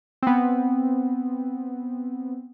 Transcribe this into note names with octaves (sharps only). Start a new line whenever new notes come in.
B3 C4